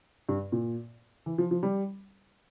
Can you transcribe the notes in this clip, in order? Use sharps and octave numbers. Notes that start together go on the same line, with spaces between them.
G2
A#2
E3
F3
F3
G3